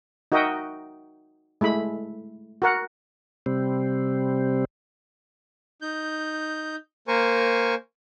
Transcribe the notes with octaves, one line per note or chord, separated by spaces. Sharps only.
D#4 F#4 A#4 D#5 E5 G5
G#3 A3 E4 B5
F#4 A#4 F#5
C3 G3 C4
D#4 G6
A#3 A#4 C5 G#5 C#6